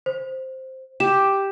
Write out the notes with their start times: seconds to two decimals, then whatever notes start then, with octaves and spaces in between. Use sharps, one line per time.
0.06 C5
1.00 G4 E7